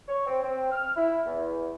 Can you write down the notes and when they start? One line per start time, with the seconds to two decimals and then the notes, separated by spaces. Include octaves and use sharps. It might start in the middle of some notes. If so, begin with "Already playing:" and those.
0.08 C#5
0.25 C4
0.42 C4
0.71 F6
0.96 E4
1.25 E2